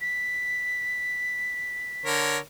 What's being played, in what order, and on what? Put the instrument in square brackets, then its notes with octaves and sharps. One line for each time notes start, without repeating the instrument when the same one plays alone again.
[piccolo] B6
[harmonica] D3 A#4 C#5